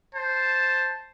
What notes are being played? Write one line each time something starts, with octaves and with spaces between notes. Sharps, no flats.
C5 A5